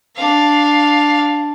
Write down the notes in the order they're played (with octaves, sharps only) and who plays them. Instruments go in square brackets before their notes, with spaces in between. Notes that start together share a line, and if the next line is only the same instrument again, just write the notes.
[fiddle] D4 F5